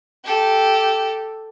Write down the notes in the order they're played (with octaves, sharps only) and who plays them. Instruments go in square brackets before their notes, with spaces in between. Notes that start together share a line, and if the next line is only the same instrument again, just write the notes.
[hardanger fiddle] G4 A4